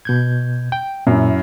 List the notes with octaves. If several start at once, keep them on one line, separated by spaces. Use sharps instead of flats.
B2 G6 G#6
G5
F#2 A#2 E4